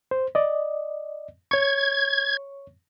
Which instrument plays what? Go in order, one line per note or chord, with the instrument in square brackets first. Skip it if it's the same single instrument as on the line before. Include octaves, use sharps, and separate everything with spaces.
[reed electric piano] C5
D5 D#5
[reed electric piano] C#5 C#6 [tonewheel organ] G#6